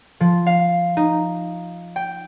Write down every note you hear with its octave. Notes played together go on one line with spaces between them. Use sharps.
F3
F5
D#4
G5